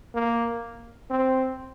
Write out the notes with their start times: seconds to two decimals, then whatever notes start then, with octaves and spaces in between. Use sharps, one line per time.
0.15 A#3
1.11 C4